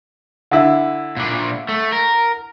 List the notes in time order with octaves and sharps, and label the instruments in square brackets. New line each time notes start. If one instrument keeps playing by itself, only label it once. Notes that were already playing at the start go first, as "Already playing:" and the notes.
[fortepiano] D3 E4
[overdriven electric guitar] A#2 D4
A3
A#4